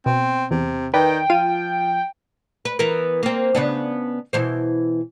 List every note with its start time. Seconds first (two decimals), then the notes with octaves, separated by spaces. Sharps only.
0.06 B2 C4
0.51 E2 C3
0.94 D#3 B4 D5 G5
1.30 F3 F4 F5 D#7
2.65 B4
2.79 E3 B3 A#4
3.23 A#3 C4
3.55 C#3 B3 D4
4.33 B2 E3 C5